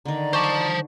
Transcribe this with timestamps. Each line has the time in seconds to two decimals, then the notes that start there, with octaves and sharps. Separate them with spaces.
0.05 D3 D#3 D5 A#5
0.33 C5 A5 C#6 D6